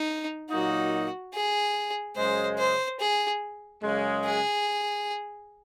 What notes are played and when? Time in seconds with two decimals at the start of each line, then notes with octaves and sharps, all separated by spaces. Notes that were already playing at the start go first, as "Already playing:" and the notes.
Already playing: D#4
0.50 A#2 F#3 A#3 D#4 F#4
1.34 G#4
2.16 F#2 C#3 G#3 C5
2.59 C5
3.00 G#4
3.82 F#2 C#3 G#3
4.25 G#4